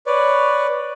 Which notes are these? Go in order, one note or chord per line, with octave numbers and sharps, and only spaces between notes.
B4 C#5 D5